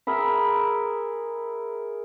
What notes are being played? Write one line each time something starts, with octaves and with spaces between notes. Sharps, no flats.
G#4 A#4 E5 B5